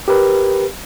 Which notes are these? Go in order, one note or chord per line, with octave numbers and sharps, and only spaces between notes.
G4 A#4 B4